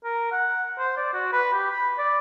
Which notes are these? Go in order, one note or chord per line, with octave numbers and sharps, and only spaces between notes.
A#4
F#5
C5
D5
F#4
B4
G4
B5
D5